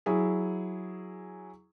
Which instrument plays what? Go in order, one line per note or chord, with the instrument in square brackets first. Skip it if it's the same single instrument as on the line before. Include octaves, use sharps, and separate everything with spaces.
[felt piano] F#3 E4 G#4